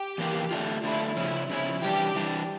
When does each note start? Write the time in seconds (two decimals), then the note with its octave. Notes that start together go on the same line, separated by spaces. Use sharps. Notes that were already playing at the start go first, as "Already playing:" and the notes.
Already playing: G4
0.18 E2 E3 A#3 D4 F4
0.51 D3 A3 D4 F4
0.84 D3 A3 D4 E4 F4
1.16 C#3 F3 C#4 E4
1.50 C#3 F3 C#4 E4
1.82 E3 G3 D4 G4
2.15 E3 G3 D4